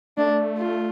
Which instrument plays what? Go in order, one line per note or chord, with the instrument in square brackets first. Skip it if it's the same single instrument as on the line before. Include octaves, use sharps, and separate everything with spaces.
[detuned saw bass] A3 [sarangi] D4
[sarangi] F4